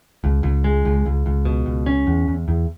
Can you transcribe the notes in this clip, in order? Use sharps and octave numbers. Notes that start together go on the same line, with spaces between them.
C#2
C#2
G#3
C#2
C#2
C#2
B2
C#2
C#4
E2
E2
E2